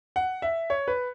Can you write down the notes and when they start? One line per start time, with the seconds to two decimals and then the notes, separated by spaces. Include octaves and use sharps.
0.16 F#5
0.42 E5
0.70 C#5
0.88 B4